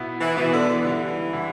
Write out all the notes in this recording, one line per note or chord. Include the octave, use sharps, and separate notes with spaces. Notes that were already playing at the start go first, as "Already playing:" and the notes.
Already playing: B2 B3 E4
E3
B2 E3 B3 E4
D3
E3
D3 G3 E4
D3 G3 E4